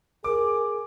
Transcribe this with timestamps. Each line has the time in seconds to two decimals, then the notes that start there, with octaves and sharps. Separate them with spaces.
0.24 G#4 A#4 D6